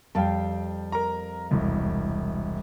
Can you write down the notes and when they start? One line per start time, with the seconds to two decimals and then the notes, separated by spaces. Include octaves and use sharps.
0.15 F2 G3 F5 G5 A5
0.92 A#4 A#5
1.51 E1 C2